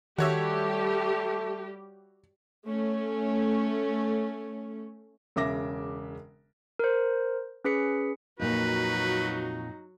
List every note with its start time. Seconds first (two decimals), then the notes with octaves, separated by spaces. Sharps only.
0.18 D#3 G3 A3 F#4 G4 C#5 E5
2.66 A3 C#4
5.36 E1 C#3 E5 D6 A#6
6.79 A#4 C5
7.65 C#4 G#4 B4 B6 C#7
8.40 F2 A#2 F#3 D#4 F#4 B4